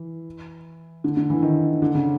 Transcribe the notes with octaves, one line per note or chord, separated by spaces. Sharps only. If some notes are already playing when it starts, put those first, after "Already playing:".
Already playing: E3
D3
D3
E3
D#3
D3
C#3